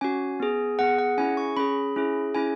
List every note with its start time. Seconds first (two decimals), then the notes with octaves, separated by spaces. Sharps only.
0.01 C#4 F#4 G#5
0.40 B3 G#4
0.78 B3 G#4 F#5
0.99 F#5
1.18 C#4 E4 G#4 G#5
1.37 C#6
1.57 C#4 G#4 B5
1.96 C#4 E4 G#4
2.34 C#4 E4 G#4 G#5